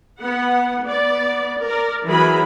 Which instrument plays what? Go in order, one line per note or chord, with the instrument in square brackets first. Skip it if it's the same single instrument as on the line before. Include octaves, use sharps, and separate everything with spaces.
[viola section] B3 F#5
B3 D5
A#4 D5
E3 F#3 B3 G#4 A#4 B5